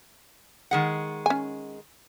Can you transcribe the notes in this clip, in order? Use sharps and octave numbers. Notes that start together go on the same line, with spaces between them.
D#3 G#3 F#5
C#4 G#5